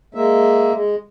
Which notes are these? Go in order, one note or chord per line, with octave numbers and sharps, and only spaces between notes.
G#3 A#3 E5
G#3